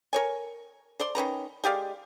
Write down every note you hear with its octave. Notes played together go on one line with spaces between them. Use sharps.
A#4 C#5 G#5
C5 D5 C6
D#3 C#4 B4 A#5
G#3 G4 D5 F5